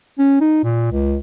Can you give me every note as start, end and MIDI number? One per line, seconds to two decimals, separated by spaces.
0.18 0.38 61
0.41 0.63 63
0.64 0.90 46
0.91 1.18 37